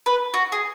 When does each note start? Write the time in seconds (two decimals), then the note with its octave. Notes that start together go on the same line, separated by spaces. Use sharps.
0.06 B4
0.34 F#4
0.52 G#4